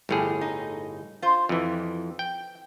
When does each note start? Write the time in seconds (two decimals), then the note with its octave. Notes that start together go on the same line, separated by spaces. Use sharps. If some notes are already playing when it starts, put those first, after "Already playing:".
0.09 G1 F2 A2 G3 G4 G#4
0.41 D#4
1.22 F4 C5
1.49 F2 E3
2.19 G5